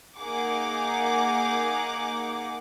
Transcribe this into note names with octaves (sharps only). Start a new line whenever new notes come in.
A#3 D#4 G#4 F#5 D6